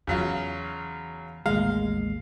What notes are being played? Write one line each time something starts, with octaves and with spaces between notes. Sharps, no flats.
E2 C#3 F#3 F4
A1 D#2 G#3 F5